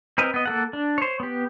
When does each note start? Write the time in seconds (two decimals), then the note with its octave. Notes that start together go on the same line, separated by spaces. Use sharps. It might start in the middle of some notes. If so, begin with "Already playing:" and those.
0.18 C4 A#4 B4 D#5
0.34 B3 D#5
0.46 A#3 A4 F#5
0.73 D4
0.98 C5 C#5
1.20 B3 G4